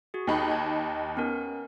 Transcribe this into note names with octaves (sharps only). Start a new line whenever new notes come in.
F#4 G#4
D#2 D#4 B5
A5 G#6
B3 C#4 A#4